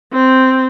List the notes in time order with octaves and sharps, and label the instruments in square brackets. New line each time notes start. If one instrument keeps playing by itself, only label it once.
[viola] C4